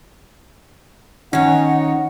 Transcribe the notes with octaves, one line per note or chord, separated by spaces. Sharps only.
D#3 C#4 D#4 C#5 F#5